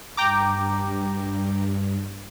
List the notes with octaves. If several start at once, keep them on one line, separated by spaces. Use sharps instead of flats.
G2 G5 A#5 D6